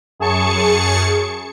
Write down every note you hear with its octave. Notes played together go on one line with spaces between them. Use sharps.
F#2 G#4 A5 C#6 C#7